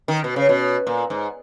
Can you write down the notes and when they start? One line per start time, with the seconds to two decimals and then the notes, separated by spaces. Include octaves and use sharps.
0.08 D#3
0.24 B2
0.36 C#3
0.49 B2
0.87 A#2
1.10 G#2